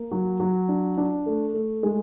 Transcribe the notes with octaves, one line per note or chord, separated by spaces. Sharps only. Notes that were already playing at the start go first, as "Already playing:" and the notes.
Already playing: A#3
F#3
F#3
D4
D4
A3
A3
G#3